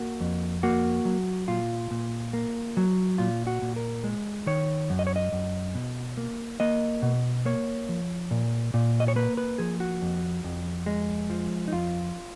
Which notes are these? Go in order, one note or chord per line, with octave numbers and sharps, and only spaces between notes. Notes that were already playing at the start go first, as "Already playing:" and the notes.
Already playing: A#3 F#4
F2
A#3 F#4
F#3
A#2 F4
A#2
A#3
F#3
A#2 F4
F#4
A#2
A#4
G#3
D#3 C#5
F#2
D#5
C#5
D#5
F#2
B2
A#3
A#3 D#5
B2
A#3 C#5
F3
A#2
A#2
D#5
C#5
A#3 B4
B4
F3 G#4
F#4
F2
F2
G#3
F3
D#4
F2 F4